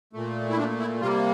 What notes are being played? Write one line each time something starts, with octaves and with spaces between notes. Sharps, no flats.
A#2 A3
E4
D4
E4
C3 G3 A#3 F4